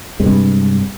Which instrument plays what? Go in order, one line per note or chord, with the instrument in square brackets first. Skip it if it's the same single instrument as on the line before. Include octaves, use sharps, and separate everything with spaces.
[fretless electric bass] G2 C3 G#3